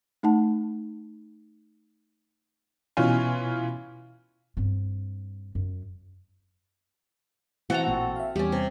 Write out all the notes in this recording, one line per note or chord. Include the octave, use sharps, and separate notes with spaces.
A3 D#4 F#5 A5
B2 E3 C#4 F4 G#5
G2 C4
F#2
E3 C4 F#4 A4 A#5
A1 A#2
E5 F5
E2 G3 C#4 G4
C3